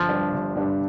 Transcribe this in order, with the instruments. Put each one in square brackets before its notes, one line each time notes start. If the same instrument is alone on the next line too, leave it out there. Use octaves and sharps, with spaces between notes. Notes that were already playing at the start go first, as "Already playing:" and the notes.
Already playing: [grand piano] G1 [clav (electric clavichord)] F3
[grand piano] G2 G3 D4
G1
G2 G3 D4